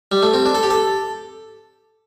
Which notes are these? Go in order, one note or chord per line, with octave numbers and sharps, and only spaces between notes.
G3
A3
C4
D4
A4
G4
A4